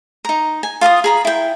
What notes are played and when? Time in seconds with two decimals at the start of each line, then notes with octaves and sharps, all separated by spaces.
0.25 D#4 A#5
0.63 G#5
0.81 F4 F5 A5 D#6
1.04 G#4 A#5 B5
1.25 E4 G5